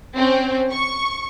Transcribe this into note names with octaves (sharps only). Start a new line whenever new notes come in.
C4 C#4
C#6